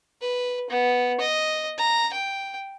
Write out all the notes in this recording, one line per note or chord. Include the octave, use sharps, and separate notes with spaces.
B4
B3
D#5
A#5
G5